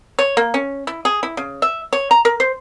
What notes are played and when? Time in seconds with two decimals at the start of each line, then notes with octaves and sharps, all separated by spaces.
0.19 C#5
0.37 A#3
0.54 C#4
0.87 E4
1.05 G#4
1.23 E4
1.37 C#3
1.62 E5
1.93 C#5
2.11 A#5
2.25 A#4
2.40 C5